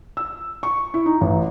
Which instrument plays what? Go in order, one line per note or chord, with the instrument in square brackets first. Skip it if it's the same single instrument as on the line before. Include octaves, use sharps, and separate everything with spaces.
[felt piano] E6
C#6
E4
D#4
A1